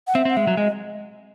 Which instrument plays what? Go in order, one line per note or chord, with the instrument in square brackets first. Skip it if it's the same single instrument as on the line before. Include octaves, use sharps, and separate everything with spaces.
[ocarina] F#5
[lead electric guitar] C4 [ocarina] E5
[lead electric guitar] C4
[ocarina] F#5
[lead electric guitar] G#3 [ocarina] E5
[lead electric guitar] F#3
[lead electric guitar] G#3 [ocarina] D#5